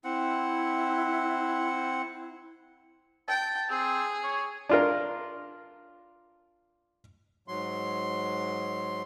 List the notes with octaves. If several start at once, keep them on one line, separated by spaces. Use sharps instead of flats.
C4 E4 F#5
G5 A5
C4 G#4
C#5
D4 F4 A#4
G#2 F#3 C6